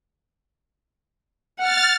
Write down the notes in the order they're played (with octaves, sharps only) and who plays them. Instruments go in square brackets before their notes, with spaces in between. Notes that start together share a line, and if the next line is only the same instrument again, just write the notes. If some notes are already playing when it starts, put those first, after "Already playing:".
[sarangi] F#5 [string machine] F6 A6